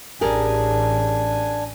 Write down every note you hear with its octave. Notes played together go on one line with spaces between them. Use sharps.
A1 D4 G4 G#4 A#4 G#5